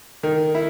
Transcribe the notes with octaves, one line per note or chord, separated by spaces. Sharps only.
D#3
E4